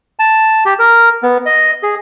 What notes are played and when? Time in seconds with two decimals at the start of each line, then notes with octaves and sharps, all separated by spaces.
0.19 A5
0.66 G4
0.79 A#4
1.23 B3
1.46 D#5
1.83 G#4